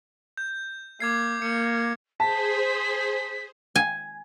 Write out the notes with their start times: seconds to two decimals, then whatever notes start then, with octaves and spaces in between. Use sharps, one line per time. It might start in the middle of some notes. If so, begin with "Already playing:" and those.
0.37 G6
1.00 A#3 D6 G#6 C7
1.42 A#3 C#7
2.20 G#4 C5 A5 B6
3.76 G#5